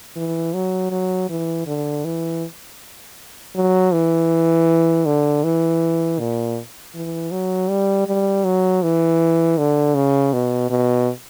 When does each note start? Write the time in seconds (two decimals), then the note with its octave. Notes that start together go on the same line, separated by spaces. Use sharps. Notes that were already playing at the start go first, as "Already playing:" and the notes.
0.16 E3
0.54 F#3
0.91 F#3
1.30 E3
1.67 D3
2.05 E3
3.56 F#3
3.93 E3
5.06 D3
5.44 E3
6.19 A#2
6.95 E3
7.32 F#3
7.70 G3
8.07 G3
8.44 F#3
8.83 E3
9.58 D3
9.95 C#3
10.33 B2
10.70 B2